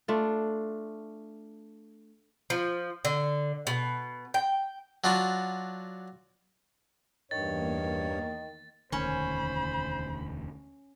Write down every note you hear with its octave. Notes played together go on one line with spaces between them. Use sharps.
A3 D4 F4
F3
D3
B2
G5
F#3 D4 F4 F#4
E2 G2 D#3 A#3 C#5 A6
E1 D2 D#3 C#4 C5 B5